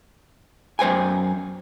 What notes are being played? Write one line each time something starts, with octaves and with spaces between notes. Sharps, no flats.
F#2 C5 G5 G#5